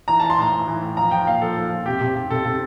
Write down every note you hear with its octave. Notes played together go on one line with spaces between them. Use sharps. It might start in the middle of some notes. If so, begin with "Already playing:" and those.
E3 A#5
A5
E3
C6
A2 A#5
A2
E3
A2
F3 A#5
F3 G5
A#2 F5
F3 A4
F3
F3
C3 G4
C3
C3
C3 A4
C3